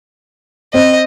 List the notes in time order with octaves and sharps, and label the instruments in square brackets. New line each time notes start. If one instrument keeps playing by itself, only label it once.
[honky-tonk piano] C4 [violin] D#5